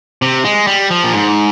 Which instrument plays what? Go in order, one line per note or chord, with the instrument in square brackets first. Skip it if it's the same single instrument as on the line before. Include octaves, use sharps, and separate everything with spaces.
[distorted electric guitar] C3
G#3
G3
F3
A#2
G#2